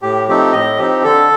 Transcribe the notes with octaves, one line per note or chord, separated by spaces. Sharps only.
A2 G4
F3 A3 C4 D#4 G4
A2 D#5
F3 C4 D#4 G4
D3 A4